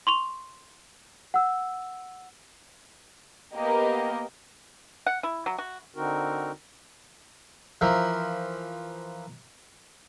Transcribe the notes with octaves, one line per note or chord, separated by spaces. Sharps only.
C6 C#6 F7
F#5 E6
A#3 B3 G4 A#4 D#5
F#5
E4
F#3
F#4
D3 C4 D#4 F#4 A#4
E3 F3 A#4